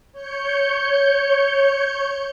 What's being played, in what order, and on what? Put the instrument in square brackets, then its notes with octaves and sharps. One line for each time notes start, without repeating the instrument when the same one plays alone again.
[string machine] C#5 G6 C#7